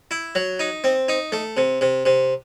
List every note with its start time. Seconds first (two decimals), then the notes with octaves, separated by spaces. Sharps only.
0.11 E4
0.35 F#3
0.59 D#4
0.84 C4
1.08 D#4
1.32 A3
1.57 C3
1.81 C3
2.05 C3